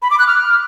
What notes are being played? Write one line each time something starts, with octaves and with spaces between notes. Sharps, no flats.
B5
D6
F#6
F6